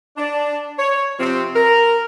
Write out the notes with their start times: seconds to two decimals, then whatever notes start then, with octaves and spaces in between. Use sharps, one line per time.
0.17 D4
0.79 C#5
1.20 C3 F3 C4
1.55 A#4